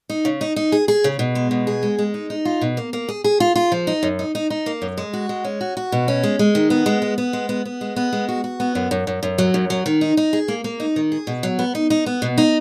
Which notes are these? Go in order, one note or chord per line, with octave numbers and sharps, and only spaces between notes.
D#4
C#3
D#4
D#4
G#4
G#4
C#3
B2
G#3
B2
G#4
G#3
G#3
D#4
D#4
F4
B2
A#3
A#3
G#4
G#4
F4
F4
F3
D#4
F#2
D#4
D#4
D#4
A#3
F#2
G#3
F#4
G#3
C#4
F#4
F#4
B2
C#4
G#3
G#3
D#3
B3
G#3
B3
B3
G#3
B3
B3
G#3
B3
G#3
F#4
F#4
B3
F#2
F#2
F#2
F#2
F#3
F#2
F#3
D#3
D#4
D#4
G#4
A#3
A#3
D#4
D#3
G#4
B2
F#3
B3
D#4
D#4
B3
B2
D#4